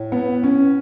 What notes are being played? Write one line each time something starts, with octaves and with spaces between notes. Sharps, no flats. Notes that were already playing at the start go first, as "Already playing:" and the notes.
Already playing: A2
B3
C#4